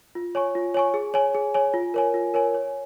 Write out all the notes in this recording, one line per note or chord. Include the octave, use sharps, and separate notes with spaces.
F4
C#5 G#5 C#6
F4
C#5 G#5 C#6
G#4
C#5 G#5
G#4
C#5 G#5
F4
A#4 C#5 G#5
F4
A#4 C#5 G#5
C#5